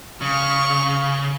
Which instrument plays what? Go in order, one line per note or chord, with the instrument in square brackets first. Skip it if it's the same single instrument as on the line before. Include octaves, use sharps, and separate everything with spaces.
[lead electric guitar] C#3 [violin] C#6 F6